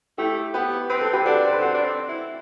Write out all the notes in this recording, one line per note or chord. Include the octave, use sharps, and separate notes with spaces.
A3 E4 G4
B3 G4 B4
C4 B4
A4
G4 B4
D4 F#4 A4
C5
B4
C4 F#4 A4
D4
C4
E4